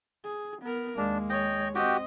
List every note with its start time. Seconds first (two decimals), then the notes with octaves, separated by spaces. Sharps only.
0.24 G#4
0.61 B3 A#4
0.97 D#2 G#3 A#3 D4
1.29 C#5 D#5 G5
1.75 C4 F#4 G4 D#5 G5